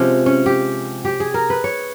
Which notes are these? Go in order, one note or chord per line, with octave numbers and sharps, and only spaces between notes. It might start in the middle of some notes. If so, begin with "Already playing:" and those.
Already playing: C3 F3 G#3 C#4
C#4
G4
G4
G#4
A#4
B4
C#5